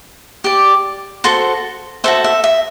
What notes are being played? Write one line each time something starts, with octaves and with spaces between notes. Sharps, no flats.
G4 D5
F#4 A4 C5 C6
F#4 A4 C5 E5
E5
E5